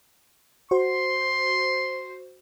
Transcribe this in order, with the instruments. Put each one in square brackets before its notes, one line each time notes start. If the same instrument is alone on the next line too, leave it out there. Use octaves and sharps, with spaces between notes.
[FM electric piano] F#4 C5 [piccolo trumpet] C6